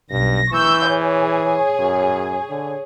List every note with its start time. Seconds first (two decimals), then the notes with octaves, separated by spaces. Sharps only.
0.11 B1 G2 A#6
0.52 E3 C#6 E6 G6
0.89 G#4 C#5
1.79 F#2
2.50 D3